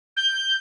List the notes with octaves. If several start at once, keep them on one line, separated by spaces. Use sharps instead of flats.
G6